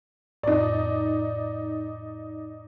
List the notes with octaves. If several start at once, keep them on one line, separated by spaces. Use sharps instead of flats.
F2 A2 D#4 D5